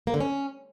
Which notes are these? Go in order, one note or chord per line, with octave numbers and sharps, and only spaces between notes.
A#3
D3
C#4